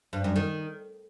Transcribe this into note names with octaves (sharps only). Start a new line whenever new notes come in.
G2
F#2
D#3